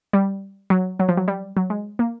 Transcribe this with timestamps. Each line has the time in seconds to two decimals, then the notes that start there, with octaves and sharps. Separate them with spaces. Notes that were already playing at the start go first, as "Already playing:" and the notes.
0.13 G3
0.70 F#3
0.99 F#3
1.09 F3
1.17 F#3
1.28 G3
1.57 F#3
1.70 G#3
1.99 A#3